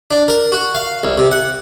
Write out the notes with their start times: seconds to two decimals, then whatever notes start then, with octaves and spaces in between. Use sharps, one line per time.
0.11 D4
0.28 A#4
0.52 F#4
0.75 F5
1.03 C2
1.18 C3
1.31 F#5